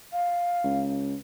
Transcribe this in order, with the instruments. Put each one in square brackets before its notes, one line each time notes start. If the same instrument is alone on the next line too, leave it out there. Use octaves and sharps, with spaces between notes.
[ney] F5
[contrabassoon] C#2